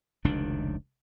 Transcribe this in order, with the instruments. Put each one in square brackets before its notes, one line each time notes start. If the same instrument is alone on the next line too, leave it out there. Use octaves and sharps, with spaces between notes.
[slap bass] F1 C#2 D#3 D4